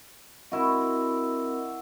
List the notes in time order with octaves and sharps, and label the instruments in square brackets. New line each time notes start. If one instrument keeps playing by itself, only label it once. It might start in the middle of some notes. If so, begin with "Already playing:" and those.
[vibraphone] C4 A#4 D#5 [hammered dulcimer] E4 F#4